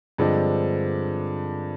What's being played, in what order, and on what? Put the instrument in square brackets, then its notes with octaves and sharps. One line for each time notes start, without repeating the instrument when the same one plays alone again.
[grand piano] G2 D3 F3 G#3 C4